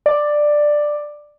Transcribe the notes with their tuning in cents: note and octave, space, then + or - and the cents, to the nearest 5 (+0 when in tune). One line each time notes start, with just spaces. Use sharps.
D5 +10